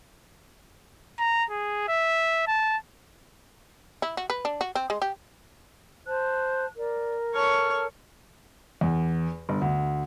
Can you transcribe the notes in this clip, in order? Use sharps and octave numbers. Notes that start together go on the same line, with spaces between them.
A#5
G#4
E5
A5
E4
F#4
B4
D4
F#4
C4
G#3
G4
C5 A5 F#6
A#4 D5
A4 C#5 A5 C#6 F6
E2
G1
D2